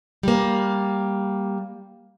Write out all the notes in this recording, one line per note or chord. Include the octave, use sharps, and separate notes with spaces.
G3 A#3